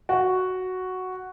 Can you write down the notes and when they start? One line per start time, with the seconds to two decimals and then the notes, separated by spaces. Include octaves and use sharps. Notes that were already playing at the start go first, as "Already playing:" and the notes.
0.09 F#4